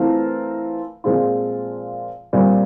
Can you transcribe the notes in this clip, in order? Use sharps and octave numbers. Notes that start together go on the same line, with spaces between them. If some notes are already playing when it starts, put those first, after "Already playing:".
Already playing: E3 A3 C4 F4 A#4
A#2 F3 G#3 C4 F4
A#2 G3 C4